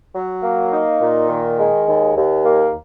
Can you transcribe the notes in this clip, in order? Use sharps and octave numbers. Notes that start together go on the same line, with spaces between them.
F#3
A#3
D#4
A#2
D#3
G#3
D#2
D#2
A#3